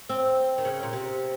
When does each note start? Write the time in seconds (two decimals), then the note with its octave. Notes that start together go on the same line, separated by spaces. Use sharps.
0.09 C4
0.58 D#3
0.65 C#3
0.83 A#2
0.93 C3